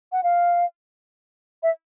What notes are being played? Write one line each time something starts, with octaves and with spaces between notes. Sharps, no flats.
F#5
F5
E5